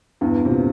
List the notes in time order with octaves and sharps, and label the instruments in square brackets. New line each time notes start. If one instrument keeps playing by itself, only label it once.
[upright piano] E2 G2
C3
A#2